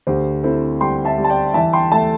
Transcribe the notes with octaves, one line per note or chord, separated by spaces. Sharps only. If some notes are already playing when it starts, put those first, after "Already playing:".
D2 G4 C5
C4 E4 A4
G3 G5 C6
E5 A5
G3
A5
D5 G5
E3 E5 A5
G5 C6
A3 E5 A5